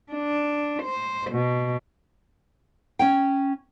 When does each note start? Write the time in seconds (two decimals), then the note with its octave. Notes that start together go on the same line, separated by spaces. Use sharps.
0.12 D4
0.83 C5
1.31 B2
2.99 C#4 C#5 G5